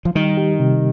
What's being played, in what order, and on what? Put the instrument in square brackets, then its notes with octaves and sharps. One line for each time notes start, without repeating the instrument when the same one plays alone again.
[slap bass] F3
[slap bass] D#3 [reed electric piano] G3
[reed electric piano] G4
C3